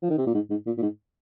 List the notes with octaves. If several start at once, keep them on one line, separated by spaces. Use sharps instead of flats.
F3
D#3
C3
A#2
G#2
G#2
A#2
A#2
G#2